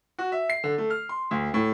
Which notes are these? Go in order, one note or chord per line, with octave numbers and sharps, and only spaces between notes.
F#4
E5
C7
D3
A3
F6
C6
D2
A2